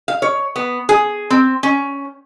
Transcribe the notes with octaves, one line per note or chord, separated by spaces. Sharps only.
F5
C#5
B3
G#4
C4
C#4